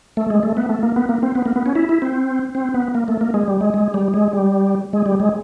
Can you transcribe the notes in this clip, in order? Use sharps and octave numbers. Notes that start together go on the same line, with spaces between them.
A3
G#3
A3
B3
A3
A#3
B3
A#3
C4
B3
A#3
B3
C#4
E4
E4
C4
C4
B3
A#3
A3
A#3
G#3
G3
G#3
G#3
G3
G#3
G3
G#3
G3
G#3